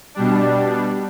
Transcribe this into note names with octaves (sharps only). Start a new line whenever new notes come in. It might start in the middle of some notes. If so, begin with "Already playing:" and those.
B2 G3 D4